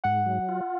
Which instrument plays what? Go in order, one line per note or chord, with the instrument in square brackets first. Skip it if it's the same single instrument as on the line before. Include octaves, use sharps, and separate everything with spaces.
[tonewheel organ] G#2 [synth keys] F#5
[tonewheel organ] F#3
F4